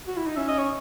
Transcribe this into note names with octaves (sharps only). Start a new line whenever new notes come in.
F#4
E4
D#4
C#4 E5
D#5
C#5